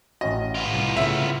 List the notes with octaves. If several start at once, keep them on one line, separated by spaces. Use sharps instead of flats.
A1 C#4 F#4 D#5
B3 F4
C2
A2 C#3 E5